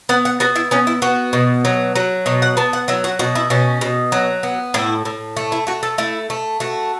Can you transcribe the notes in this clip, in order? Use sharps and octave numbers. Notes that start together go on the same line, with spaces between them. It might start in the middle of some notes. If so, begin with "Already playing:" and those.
B3 F#5
F#5
B3 F#4
E4
B3 C#4
E4
B3 F#4
B2
F#3
F#3
B2 C#5
F#5
B3 A5
F#5
F#3 E4
F#4
B2 F#4
E4
B2 C#4
B2
F#3
B3
A2 E4
A2
A3
E4
A3 F#4
A4
A3 E4
A3
A3 F#4